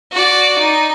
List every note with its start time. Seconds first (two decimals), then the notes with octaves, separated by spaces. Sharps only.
0.12 F#4 D5
0.59 D#4